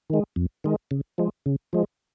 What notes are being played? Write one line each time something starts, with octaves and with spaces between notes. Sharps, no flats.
D#3 G#3
F2
D#3 G#3
C#3
F3 G#3
C#3
F3 G#3